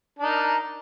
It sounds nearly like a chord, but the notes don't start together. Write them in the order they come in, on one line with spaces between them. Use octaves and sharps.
D4 D#4 A#4